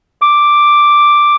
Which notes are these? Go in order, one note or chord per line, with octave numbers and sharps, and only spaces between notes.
D6